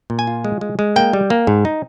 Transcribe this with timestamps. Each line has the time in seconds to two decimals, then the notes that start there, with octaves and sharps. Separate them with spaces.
0.10 A#2
0.19 G#5
0.27 F4
0.45 G#3
0.61 G#3
0.79 G#3
0.96 A#3 G5
1.13 G3
1.30 A#3
1.47 G#2
1.65 D#4